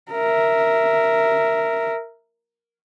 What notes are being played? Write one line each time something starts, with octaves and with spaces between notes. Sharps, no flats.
A#4 E5